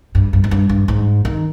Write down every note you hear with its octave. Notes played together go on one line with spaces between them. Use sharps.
G2
G2
G#2
G2
G2
G#2
D#3